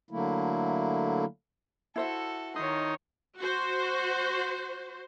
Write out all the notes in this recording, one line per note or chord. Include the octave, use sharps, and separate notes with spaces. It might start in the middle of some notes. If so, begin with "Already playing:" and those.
D3 F#3 A3 A#3 E4
E4 F#4 A4 C5 E5
D#3 D#4 C#5 C6
F#4 C5